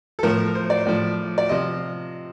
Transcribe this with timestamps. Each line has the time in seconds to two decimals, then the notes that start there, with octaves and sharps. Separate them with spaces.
0.19 A4
0.23 A2 F3 A#4
0.55 C5
0.70 D5
0.87 A2 F3
1.38 D5
1.49 C3 F3 D#5